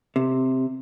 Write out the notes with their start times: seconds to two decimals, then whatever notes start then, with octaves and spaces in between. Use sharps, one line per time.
0.16 C3